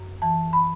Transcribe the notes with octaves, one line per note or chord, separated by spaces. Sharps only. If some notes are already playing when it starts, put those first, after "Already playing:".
Already playing: F#2
E3 A5
B5